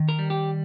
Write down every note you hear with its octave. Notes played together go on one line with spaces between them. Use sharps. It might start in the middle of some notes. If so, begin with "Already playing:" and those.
Already playing: D#3
A#4
G3
G4